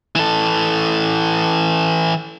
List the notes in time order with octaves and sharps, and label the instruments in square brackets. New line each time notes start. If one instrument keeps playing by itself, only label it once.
[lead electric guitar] E3 A4